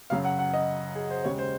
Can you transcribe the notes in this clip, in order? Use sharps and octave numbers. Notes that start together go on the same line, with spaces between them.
F#2 C#3 F#3 F5
F#5
F#5
D#5
G#4
C5
D#2 C#3 G#3 C#5
C5